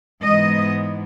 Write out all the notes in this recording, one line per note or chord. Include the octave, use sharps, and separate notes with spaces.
G#2 E3 B3 D#5